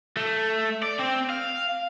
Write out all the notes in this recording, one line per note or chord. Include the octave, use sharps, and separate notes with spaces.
A3
D5
C4
F5